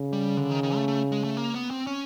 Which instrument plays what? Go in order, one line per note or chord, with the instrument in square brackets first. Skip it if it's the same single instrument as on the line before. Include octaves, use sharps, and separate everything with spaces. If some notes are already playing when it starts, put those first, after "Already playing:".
Already playing: [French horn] C#3
[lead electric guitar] G3
D3
D#3
D#3
A3
A3
G#3
A3
A#3
B3
C4
C#4